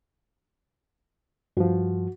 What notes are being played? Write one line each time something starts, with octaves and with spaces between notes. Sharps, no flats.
G2 F3 F#4